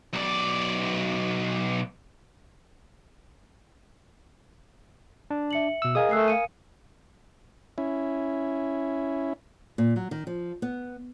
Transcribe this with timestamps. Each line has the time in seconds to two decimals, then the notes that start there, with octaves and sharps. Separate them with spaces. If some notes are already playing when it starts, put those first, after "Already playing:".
0.13 B1 D5
5.30 D4
5.51 E5 C#7 F#7
5.82 B2 E6
5.95 G#4 A#4 D#5 F5 G#5 D#6
6.11 A3 E6 F#6 C7
6.28 F5 C#7 D#7
7.78 C#4 E4
9.78 A#2
9.96 F#3
10.11 D#3
10.27 F3
10.62 B3